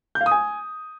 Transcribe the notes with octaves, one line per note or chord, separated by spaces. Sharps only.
G6
F5
D#6
G#5